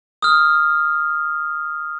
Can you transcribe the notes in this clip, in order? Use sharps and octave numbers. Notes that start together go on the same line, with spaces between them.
D#6 F6